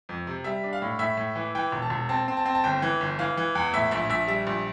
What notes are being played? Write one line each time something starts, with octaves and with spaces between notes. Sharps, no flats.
F2
C3
G3 E5
D4
F5
A2
A2 E5
A2
E3
E3 G5
E1
A5
E1
C4 A5
C4
A5
C4
A5
G1 G5
E3
G1
E3 F5
E3
E2
A2 E5
A#1 E5
A#1 E5
G3 E5
A#1